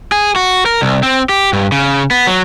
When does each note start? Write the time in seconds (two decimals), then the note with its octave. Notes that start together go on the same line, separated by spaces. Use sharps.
0.12 G#4
0.36 F#4
0.66 A#4
0.82 C2
1.03 C4
1.29 G4
1.53 G2
1.72 C#3
2.11 B3
2.27 F#3